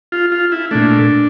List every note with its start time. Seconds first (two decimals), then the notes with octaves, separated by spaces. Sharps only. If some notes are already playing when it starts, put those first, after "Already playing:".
0.12 F4
0.32 F4
0.52 E4
0.71 A#2 A3 D4